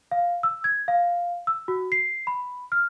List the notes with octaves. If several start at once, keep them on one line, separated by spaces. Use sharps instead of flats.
F5
E6
G#6
F5
E6
F#4
C7
B5
F6